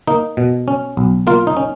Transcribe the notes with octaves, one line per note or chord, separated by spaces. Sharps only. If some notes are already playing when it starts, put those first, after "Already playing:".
A#3 D#4
B2
C#4
B1
A#3 F4
D#4
C#4